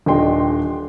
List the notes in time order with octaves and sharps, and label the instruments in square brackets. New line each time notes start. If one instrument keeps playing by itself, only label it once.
[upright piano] D#1 D4 D#5 G5 C6